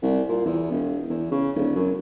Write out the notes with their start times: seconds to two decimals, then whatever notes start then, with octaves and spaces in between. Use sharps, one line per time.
0.02 C2
0.29 A#2
0.45 E2
0.72 E1
1.10 E2
1.32 C#3
1.56 D1
1.76 F#2